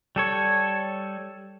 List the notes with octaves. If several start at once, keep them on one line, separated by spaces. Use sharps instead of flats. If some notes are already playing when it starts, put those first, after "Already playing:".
G3 A4 C#5